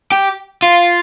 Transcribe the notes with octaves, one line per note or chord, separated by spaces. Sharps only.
G4
F4